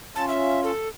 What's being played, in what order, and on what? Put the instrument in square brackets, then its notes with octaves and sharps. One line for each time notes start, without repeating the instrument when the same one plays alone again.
[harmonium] C#4 F4 [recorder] A5
[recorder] E5
A4